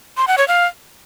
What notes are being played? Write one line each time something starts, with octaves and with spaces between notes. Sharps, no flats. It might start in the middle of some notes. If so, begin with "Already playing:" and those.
C6
F#5
C#5
F5